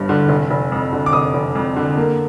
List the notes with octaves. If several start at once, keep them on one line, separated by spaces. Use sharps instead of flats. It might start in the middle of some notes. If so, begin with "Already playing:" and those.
Already playing: G1 G2
D3
F1
F1
F2
D3
D6
F1 D#6
F1
F2
D3
A#3